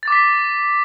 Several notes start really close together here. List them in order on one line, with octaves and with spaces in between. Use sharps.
A6 D6 B6